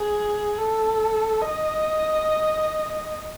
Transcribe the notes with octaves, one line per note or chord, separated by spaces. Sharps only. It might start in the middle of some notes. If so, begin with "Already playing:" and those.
Already playing: G#4
A4
D#5